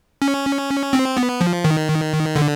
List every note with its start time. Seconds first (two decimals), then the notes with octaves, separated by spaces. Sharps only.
0.22 C#4
0.93 C4
1.17 B3
1.41 F3
1.64 D#3
2.36 D3